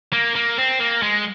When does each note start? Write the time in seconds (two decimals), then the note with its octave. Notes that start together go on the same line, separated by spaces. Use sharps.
0.13 A#3
0.35 A#3
0.58 C4
0.80 A#3
1.02 G#3